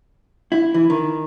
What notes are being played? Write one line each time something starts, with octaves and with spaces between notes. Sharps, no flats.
E4
E3
D#3